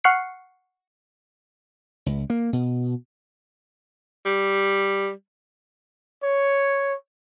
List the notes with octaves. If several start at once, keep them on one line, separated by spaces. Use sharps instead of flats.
F#5 C#6 F6 F#6 C7 C#7
C#2
A#3
B2
G3
C#5